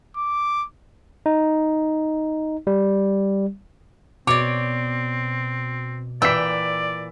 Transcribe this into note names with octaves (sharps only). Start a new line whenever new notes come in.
D6
D#4
G3
B2 C4 C#5 D5 D6
A#2 E3 D5 G5 E6 B6